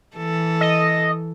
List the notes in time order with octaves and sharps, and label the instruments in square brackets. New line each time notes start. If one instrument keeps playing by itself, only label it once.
[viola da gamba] E3 A4
[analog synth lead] D#5